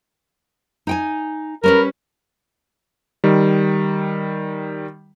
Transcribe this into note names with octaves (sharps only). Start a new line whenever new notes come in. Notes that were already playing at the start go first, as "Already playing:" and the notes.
D#4 G5 G#5
G3 C#4 A#4 B4
D#3 G3